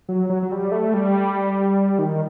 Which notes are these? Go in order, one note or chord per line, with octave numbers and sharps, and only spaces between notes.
F#3
F#3
F#3
G3
A3
G3
D#3